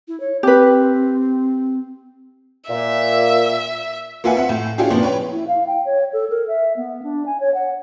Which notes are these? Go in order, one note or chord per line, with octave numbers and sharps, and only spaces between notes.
E4
C#5
C4 G4 B4
A#2 E5
A#3 F4 B4 E5 F#5 G#5
C4 E5 F#5
A2
C#4 D4 E4 F4 G4 G#4
A#2 F3 B3 C4 D4
B4 C#5 G5
E4
F5
G5
C#5
A4
A#4
E5
B3
D4
G#5
C#5
F#5